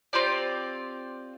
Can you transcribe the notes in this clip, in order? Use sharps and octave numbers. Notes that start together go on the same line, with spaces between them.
C4 F4 G4 D5